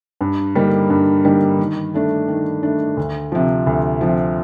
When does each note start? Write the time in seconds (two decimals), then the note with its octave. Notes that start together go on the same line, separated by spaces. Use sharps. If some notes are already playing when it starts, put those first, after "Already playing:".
0.21 G2
0.55 D3 G3 A#3 D#4
0.90 G2
1.24 D3 G3 A#3 D#4
1.59 D#3
1.94 A3 D4
2.28 D#3
2.63 A3 D4
2.97 D2
3.32 C3 F3
3.67 D2
4.01 C3 F3